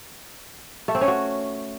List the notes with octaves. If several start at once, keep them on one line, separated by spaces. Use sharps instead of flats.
A3
C4
C#4
F#4